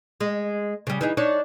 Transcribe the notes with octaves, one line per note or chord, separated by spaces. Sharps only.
G#3
C#3 G3
E3 D#4 G#4
D4 D#4 C#5